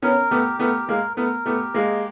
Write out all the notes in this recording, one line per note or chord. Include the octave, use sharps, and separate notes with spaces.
B3 C#4 A#4
A3 B3 G4
A3 B3 A#4
G#3 A#3 A#4
A3 B3 A#4
A3 B3 G4
G#3 A#3 D#5